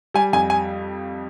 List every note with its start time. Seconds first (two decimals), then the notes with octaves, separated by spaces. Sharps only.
0.14 G3 G#5
0.33 F2 G#5
0.50 G#5